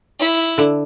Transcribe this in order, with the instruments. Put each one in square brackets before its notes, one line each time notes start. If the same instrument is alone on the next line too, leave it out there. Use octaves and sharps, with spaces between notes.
[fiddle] E4
[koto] D3